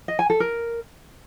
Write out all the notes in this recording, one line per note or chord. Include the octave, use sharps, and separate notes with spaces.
D#5
G#5
A4
A#4